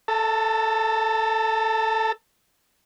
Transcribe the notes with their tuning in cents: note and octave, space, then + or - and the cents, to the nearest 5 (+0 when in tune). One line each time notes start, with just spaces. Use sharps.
A4 +0 A5 +45